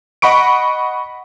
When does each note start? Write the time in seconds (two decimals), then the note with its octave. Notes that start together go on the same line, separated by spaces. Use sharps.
0.22 D#5 F#5 B5 C#6 D7